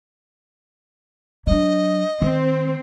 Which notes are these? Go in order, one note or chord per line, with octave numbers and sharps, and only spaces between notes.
F#3 D4 D#5
D#3 C4 C5